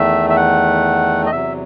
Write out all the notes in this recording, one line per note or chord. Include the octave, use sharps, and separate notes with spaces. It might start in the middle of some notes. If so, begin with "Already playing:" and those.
Already playing: E2 D#3 A3 E5
E5
F#5
D#5
E2 C3 F#3 E5